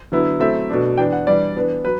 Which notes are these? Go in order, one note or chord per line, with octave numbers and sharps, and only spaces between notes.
D3 F#3 B3 E4
F#3 A3 C4 E4 E5
B2 A3 D4
E3 B3 D4 G5
F#5
E3 G3 D4 D5
E3 B3 D4
F#3 B4